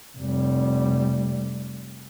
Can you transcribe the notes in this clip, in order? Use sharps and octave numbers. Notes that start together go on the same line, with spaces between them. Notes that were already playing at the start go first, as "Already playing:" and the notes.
F1 G3